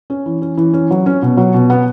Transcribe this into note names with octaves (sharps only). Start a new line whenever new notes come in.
C#4
E3
C#4
E3
C#4
F#3
C#4
B2
F#3
B2
B3